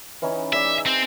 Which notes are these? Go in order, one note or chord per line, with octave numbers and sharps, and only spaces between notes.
E3 C#4 D#4
G#4 D5 E5 G#5
D#4
C4